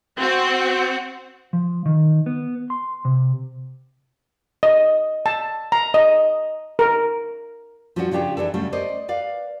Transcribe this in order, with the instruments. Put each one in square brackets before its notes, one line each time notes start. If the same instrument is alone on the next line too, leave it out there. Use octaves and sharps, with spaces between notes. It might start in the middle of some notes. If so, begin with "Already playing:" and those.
[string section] C4 F#4
[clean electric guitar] F3
D#3
B3
C6
C3
[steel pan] D#5
A5
A#5
D#5
A#4
[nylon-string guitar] F3 G3 C#4 D4 F4 F#4
C#3 F3 D4 G4 G#4
E3 D4 G#4 A4
C#3 F#3 G3 A3
C5 D5 D#5
B4 D5 F5